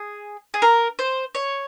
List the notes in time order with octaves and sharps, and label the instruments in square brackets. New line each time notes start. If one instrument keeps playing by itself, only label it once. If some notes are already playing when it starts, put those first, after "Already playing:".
Already playing: [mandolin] G#4
G#4
A#4
C5
C#5